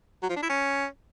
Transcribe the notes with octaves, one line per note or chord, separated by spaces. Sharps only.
F#3
F3
D4
E4
C#4